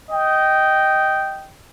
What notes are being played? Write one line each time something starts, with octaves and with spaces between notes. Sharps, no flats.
D#5 G5